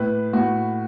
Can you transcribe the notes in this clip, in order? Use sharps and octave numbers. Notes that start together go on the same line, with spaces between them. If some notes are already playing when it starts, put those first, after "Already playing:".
Already playing: A2 B4
A2 F#4